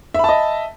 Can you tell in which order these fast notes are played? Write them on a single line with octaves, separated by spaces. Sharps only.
E5 B5 A5 D#5